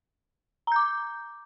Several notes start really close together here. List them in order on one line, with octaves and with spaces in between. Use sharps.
A#5 G6 D6